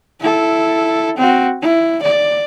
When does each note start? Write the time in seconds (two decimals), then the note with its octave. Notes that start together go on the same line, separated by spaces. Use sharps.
0.20 E4 A4
1.17 C4 F#4
1.62 E4
2.03 D5